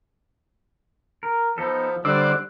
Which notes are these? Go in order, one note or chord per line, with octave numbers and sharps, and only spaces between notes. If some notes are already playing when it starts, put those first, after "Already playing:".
A#4
F3 B3 D#4 A4
D3 G3 D4 C5 D5 E6 F#6